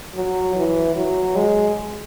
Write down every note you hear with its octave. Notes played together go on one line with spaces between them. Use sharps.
F#3
E3
F#3
G#3